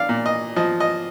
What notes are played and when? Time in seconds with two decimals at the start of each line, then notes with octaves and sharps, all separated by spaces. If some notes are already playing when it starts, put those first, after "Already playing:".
Already playing: D4 D5 F5
0.09 A#2
0.26 D#5
0.56 F3 D#5
0.80 D#5